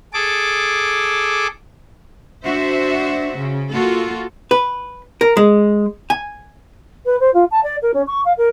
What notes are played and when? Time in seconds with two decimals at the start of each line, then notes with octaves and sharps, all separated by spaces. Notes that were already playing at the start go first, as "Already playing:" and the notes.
0.14 G#4 A4 D6
2.44 D4 F#4 C5 E5
3.37 C#3
3.71 A#3 F4 F#4 A4
4.51 B4
5.21 A#4
5.37 G#3
6.10 G#5
7.05 B4
7.20 C5
7.34 F4
7.51 A5
7.63 D5
7.82 A#4
7.94 C#4
8.07 C#6
8.25 F5
8.37 A#4